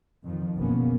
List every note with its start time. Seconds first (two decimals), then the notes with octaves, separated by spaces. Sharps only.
0.23 F2 D#3 F3
0.55 F#1 B2 A#3 B3 C#4